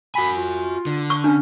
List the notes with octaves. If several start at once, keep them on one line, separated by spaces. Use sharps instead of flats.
F#4 G#5 B5
F4
D3
C#6
C#4 D4